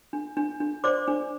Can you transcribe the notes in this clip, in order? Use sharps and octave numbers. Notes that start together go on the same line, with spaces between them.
D4
D4
D4
C5 D5 D6
D4